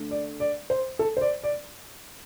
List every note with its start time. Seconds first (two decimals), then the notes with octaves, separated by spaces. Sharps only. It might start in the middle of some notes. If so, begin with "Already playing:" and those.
Already playing: D3 A3
0.11 D5
0.40 D5
0.70 C5
0.99 A4
1.17 C5
1.21 D5
1.43 D5